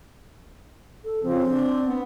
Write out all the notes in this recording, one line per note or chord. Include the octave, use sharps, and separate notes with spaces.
A4
C#3 F3 C4
D4
B3